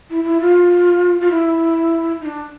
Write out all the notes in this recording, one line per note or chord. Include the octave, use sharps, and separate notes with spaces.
E4
E4
F4
F4
E4
D#4
D4